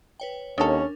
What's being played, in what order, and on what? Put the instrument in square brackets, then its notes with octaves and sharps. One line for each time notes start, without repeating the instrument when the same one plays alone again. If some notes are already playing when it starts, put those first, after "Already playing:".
[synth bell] B4 C#5 G5
[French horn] D#2 [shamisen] D#3 A4 [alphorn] C#4 [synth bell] D4 A#4